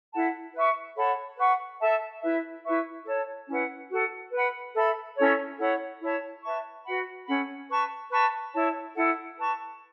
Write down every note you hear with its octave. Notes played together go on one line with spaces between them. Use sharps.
E4 A4 F#5 A5
B4 E5 C#6
A4 C#5 F#5 B5
B4 F#5 C#6
A4 E5 A5
E4 B4 E5
E4 B4 E5 C#6
A4 C#5 A5
C#4 E4 B4 F#5
F#4 A4 F#5
B4 F#5 B5
A4 E5 B5
C#4 E4 A4 C#5
E4 A4 C#5 F#5
E4 C#5 A5
B4 E5 A5 C#6
F#4 B4 F#5 B5
C#4 A4 F#5 B5
B4 A5 C#6
B4 A5 C#6
E4 C#5 A5
E4 A4 F#5
B4 A5 C#6